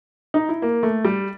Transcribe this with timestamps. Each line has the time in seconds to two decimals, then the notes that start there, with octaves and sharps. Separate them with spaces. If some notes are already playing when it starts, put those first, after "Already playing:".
0.34 D#4
0.49 E4
0.62 A#3
0.83 A3
1.05 G3